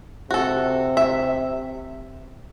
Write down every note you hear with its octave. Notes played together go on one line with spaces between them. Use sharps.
C3 F#4 A4
E5